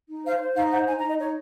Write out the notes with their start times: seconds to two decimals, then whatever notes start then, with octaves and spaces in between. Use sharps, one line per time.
0.09 D#4
0.25 C5 F5
0.35 C#5
0.41 C5
0.56 D#4 F5
0.72 C5 F#5
0.87 D#4 G#5
0.98 A#5
1.03 D#4
1.08 D#5
1.18 D#4 C#5